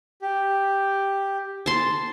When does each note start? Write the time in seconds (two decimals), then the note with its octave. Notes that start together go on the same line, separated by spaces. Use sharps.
0.22 G4
1.66 A5 C6